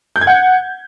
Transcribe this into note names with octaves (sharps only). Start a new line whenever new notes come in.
G6
G#6
F#5